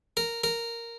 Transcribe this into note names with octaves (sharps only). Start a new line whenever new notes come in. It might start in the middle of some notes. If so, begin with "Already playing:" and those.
A#4
A#4